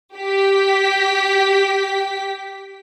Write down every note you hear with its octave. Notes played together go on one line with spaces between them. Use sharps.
G4 B6